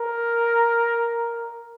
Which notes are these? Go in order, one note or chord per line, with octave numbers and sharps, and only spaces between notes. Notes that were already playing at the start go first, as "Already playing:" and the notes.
Already playing: A#4